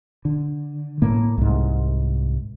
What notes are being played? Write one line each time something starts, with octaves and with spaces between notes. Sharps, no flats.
D3
A2 A#3
C2 G#2